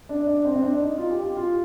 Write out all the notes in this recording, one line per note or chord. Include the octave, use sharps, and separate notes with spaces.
D4
D4
C4
C4
D4
D#4
F4
G4
G4
F4